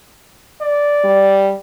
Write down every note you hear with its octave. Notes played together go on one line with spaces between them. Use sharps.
D5
G3